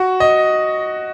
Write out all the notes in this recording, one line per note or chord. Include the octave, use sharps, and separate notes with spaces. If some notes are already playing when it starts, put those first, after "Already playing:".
Already playing: F#4
D#5